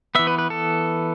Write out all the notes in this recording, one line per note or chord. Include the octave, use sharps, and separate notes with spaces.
E3 B3 E5
B4
B4
A4